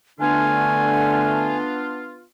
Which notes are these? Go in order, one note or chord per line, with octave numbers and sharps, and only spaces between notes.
D3 A3 B3 D4 F4 G#5